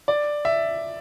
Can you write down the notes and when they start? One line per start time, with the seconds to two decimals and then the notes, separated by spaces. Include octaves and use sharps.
0.08 D5
0.45 E5